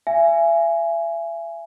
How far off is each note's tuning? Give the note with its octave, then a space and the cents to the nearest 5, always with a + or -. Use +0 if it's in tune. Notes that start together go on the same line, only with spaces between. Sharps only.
E5 +35 G#5 +0